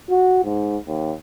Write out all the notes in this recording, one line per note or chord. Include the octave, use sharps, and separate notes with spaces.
F#4
G#2
D#2